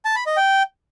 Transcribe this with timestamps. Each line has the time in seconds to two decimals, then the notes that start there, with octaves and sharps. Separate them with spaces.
0.05 A5
0.16 B5
0.26 D#5
0.37 G5